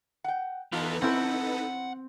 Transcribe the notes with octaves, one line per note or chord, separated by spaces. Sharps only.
F#5 G5
E3 B3 D#4 F4 A4 B4
C4 C#4 E4 F#5